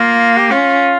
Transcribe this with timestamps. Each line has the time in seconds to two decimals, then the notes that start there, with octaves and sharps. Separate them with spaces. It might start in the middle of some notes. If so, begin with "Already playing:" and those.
Already playing: A#3 F4
0.37 G4
0.50 C#4 F4